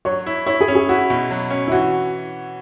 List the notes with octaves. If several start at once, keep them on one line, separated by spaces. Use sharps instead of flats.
F#3 C#5
E4
E4 C#5
G#4
C#4
G#4
E4 F#4
B2
F#3
C#4
E4
E3 F#4